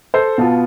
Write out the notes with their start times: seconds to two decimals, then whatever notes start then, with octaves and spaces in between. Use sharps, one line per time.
0.14 A4 C5
0.38 B2 B3 F4 F5 A5